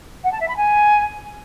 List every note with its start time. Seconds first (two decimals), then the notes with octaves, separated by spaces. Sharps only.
0.24 F#5
0.32 A5
0.40 E5
0.48 B5
0.56 G#5